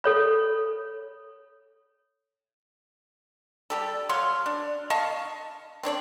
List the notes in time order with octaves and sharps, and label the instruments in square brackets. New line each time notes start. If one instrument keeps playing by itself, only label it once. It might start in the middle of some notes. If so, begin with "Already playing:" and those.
[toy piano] A4 C#5 B5
[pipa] G3 G4 A4
F#3 C#5 F5 C6
D4
D#5 F5 A5 C#6
C4 D4 C#5 D5